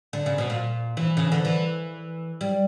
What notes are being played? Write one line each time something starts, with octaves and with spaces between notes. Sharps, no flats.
D3
C#3
B2
A#2
E3
C#3
D3
E3
G3